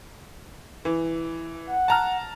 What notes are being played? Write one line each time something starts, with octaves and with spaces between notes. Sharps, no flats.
E3
F#5
A5 A#5 F6